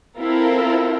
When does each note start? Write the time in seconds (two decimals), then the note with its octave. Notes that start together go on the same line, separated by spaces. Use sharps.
0.18 C4 E4 F4 A4 A#4